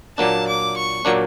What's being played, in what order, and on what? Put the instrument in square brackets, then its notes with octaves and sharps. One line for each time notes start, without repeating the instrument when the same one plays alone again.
[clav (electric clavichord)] A#2 F#3 A#3 D4 [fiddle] A5
[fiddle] D6
C#6
[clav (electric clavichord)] A#2 F#3 A#3 D4